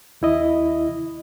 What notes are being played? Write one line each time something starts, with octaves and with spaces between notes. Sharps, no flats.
D#2 E4 D#5